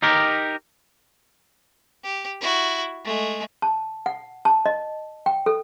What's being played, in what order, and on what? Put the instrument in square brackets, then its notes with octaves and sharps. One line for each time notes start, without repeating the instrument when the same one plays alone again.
[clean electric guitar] D#4 G4 A#4
[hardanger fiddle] G4
E4 F#4
G#3 A3
[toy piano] A5
F#5
A5
D#5
G5
A4